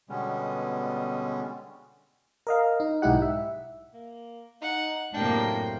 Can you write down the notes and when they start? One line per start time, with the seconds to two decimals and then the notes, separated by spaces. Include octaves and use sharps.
0.09 B2 D3 G3 G#3 B3 C#4
2.47 A#4 D#5 F5
2.80 D#4
3.02 B1 G#2 D#4 E4 G4 F#5
3.22 E5
3.93 A#3
4.62 D#4 F#5
5.14 F#2 A2 C3 A#3 D4 G5